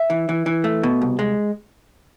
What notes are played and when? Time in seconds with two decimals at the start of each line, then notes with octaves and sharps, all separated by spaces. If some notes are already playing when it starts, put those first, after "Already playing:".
Already playing: E5
0.10 E3
0.29 E3
0.46 E3
0.64 A3
0.83 B2
1.02 C2
1.19 G#3